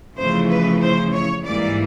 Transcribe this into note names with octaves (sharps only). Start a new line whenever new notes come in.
F2 C#3 E3 A3 C5
B4
C5
C#5
G#2 E3 G3 A#3 D5